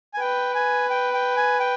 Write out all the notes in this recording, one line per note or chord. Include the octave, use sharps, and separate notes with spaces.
G#5
B4 G5
G#5
G5
G5
G#5
G5